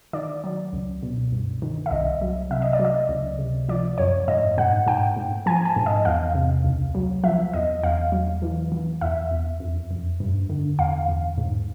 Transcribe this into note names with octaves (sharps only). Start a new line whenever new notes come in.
D#3 D5
F#3
C#2
B2
G2
D#3
E5
C2 D#5
F#3
C3 E5
D#5
D5
F#3
D#5
C#2
C3
F3 D5
F#2 C#5
G#2 D#5
G#2 F#5
G#2 G5
G#2
F3 G#5
A5
G#2
D#5
E2 F5
C3
C#2
F#3
F3 E5
E2 D#5
E2 F5
F#3
E3
E3
E2 E5
E2
F2
F2
G2
D3
E2 F5
E2
G#2